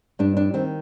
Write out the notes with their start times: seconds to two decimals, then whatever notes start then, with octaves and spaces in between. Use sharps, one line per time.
0.19 G2 D4
0.37 D4
0.54 D#3 C4